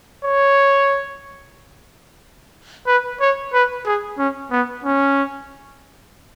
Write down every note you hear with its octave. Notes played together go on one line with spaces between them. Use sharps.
C#5
B4
C#5
B4
G#4
C#4
B3
C#4